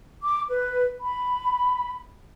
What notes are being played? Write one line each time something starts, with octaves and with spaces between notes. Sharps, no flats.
D6
B4
B5